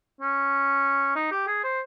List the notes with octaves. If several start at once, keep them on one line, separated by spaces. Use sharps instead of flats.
C#4
D#4
G4
G#4
C5